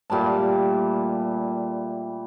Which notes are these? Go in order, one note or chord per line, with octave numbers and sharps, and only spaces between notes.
A#2 G3 A3 A5